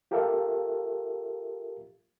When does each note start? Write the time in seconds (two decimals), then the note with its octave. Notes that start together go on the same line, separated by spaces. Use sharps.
0.11 F4 G4 A4 A#4 E5 F5